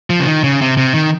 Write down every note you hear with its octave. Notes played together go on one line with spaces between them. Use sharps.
F3
C#3
D#3
C#3
C3
C3
D#3